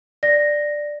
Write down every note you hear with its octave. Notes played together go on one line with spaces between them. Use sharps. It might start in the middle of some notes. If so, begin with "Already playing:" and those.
D5 A#6